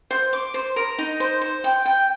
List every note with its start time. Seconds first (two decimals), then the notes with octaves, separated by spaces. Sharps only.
0.11 C5
0.33 D6
0.54 C5
0.76 A#4
0.98 D#4
1.20 C5
1.41 C5
1.64 G5
1.86 G5